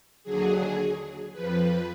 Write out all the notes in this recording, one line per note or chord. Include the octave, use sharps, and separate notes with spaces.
D#2 D3 F#3 G#4
F2 F3 B4